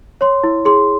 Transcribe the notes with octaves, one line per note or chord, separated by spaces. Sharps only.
C#5 C6
E4
G#4 C6